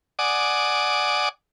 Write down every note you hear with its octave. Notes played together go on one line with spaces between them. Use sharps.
D5 F#5 G#5 D6 D#6